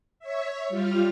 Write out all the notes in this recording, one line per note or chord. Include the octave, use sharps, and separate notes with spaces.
C#5 E5
G3 F4 F6